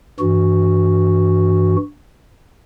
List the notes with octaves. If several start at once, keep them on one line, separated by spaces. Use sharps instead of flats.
G2 E3 F#4